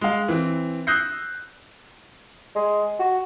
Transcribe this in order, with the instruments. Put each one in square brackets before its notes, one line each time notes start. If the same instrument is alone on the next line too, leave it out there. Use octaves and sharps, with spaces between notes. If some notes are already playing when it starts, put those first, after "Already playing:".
[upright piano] G#3 F5
E3 C4
D#6 E6 F#6 G6 A#6 C7
[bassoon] G#3
F#4